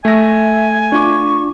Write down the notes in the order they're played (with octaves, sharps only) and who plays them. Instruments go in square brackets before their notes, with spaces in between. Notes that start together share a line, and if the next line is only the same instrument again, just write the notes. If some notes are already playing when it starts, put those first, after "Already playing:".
[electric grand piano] A3 A#6 [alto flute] E5 [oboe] G#5
[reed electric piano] D4 F4 D6 [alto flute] C#6